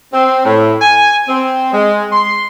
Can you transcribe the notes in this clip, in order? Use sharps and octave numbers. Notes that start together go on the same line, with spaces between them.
C4
A2
G#5
C4
G#3
C6